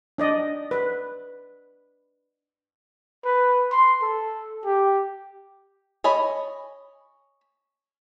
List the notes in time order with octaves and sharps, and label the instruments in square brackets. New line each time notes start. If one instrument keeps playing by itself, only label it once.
[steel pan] D4 D5 D#5
B4
[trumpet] B4
C6
A4
G4
[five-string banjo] C#5 D#5 G#5 A5 B5